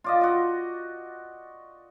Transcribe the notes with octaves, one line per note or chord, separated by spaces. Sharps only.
F4 D5 D#5
F#4 D#5